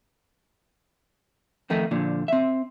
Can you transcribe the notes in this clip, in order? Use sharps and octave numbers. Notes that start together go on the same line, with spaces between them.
F2 D#3 A3 D#4
A#2 D3 F3
C4 E5